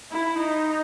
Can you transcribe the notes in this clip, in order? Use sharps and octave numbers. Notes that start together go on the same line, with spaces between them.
E4
D#4